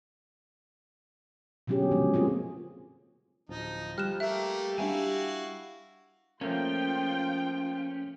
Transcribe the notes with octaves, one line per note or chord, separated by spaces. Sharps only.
B2 D3 F#3 C#4 G4 G#4
A#2 C#3 F3 G#3
A#3 C4 F4 G#4
D1 F3 D#4
G3 F6 F#6 E7
A3 A#3 G4 E5
G3 A#3 D4 E4 F#4 F5 G#5
F3 A3 A#3 C#4 F4 G5